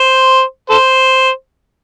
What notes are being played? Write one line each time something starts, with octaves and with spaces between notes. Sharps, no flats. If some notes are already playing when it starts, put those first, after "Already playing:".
Already playing: C5
A4 C5